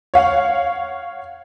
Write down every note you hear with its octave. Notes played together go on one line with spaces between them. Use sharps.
C#5 F5 F#5